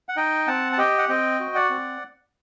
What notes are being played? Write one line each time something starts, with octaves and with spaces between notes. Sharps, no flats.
F#5
D#4 D#5 G5
C4 F#5 A5
A5
G4 D#5 G5
F#5
C4 D#5 G5
F#4
D5 F#5
C4